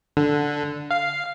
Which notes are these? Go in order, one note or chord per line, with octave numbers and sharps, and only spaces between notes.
D3
F5